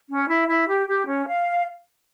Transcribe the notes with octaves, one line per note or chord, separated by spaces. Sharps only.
C#4
E4
E4
G4
G4
C#4
F5